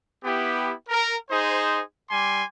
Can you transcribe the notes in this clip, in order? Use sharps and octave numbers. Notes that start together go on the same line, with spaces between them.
B3 E4 G4
A#4
D#4 G#4 C5
G3 G#5 C6 D6